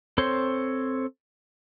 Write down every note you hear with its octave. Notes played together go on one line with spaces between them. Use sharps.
C4 A4 C5 C#5 C6